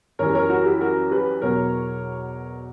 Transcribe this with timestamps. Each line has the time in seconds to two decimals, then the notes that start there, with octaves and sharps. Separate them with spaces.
0.19 F#2 E3 G3 A#4 C#5
0.35 A#4 C#5
0.50 F#4 A#4
0.65 E4 G4
0.81 F#4 A#4
1.11 G4 B4
1.42 E2 B2 F#3 A#4 C#5